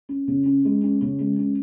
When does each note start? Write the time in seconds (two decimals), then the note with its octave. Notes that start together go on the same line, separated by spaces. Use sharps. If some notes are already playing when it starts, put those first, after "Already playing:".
0.09 C#4
0.28 C#3
0.46 C#4
0.65 G#3
0.84 C#4
1.02 C#3
1.20 G#3
1.39 C#4